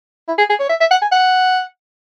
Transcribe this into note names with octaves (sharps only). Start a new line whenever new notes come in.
E4
G#4
G#4
C#5
E5
E5
F#5
G#5
F#5